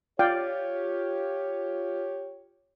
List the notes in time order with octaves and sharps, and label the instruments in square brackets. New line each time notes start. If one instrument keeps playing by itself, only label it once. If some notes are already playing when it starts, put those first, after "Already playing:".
[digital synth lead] F4 [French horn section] G4 C#5 [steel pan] D5 F5 G5